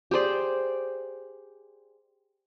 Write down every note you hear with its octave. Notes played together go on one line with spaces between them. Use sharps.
G4 G#4 C5 D5